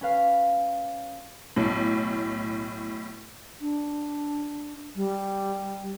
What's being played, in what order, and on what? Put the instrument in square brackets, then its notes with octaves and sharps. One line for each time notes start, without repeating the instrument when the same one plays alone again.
[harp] C#4 B4 F5
[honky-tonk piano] B1 A2
[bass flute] D4
G3